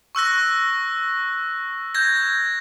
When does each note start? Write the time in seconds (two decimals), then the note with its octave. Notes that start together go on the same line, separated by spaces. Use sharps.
0.15 C#6 E6 F#6 A#6
1.95 G6 G#6 A#6